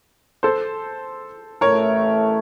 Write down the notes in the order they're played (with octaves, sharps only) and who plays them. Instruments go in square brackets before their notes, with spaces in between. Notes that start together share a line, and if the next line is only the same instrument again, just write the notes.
[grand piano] A4 C5
[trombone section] A1 A2 A3 [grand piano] A#4 C#5